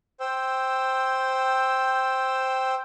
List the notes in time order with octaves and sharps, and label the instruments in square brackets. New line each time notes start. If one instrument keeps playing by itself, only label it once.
[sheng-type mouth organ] C5 G5 E6